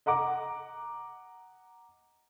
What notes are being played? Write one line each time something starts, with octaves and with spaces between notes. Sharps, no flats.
D#5 F#5 A#5 D6